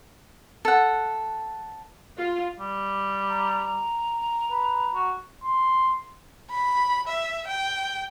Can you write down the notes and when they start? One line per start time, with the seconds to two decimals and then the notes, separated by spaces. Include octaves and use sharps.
0.65 A4 F#5
2.18 F4
2.60 G3
3.29 A#5
4.51 B4
4.95 F#4
5.44 C6
6.51 B5
7.08 E5
7.48 G5